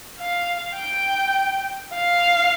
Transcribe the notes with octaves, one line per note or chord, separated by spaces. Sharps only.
F5
G5
F5